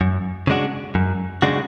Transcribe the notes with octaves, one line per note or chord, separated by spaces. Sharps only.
F#2
C#3 G#3 D4 F#4
F#2
C#3 G#3 D4 F#4